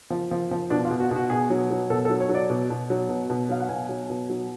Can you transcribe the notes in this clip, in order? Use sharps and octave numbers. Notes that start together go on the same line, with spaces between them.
F3
F3
F3
B2 D4
F4
B2
F#4
B2
F#4
B2 G#4
F#3
F#3
B2 A4
A4
F#3
C#5
F#3
D5
B2
B2
F#3
B2
B2
F#3 F5
F#5
B2 G#5
F#3
B2
F#3